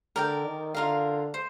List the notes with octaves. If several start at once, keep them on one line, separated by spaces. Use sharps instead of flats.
D3 A#4 D5 G5
D#3
D3 F4 A#4 F5
C5